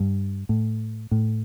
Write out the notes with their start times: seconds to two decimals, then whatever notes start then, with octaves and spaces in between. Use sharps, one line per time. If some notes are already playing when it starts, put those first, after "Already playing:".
Already playing: G2
0.49 A2
1.11 A2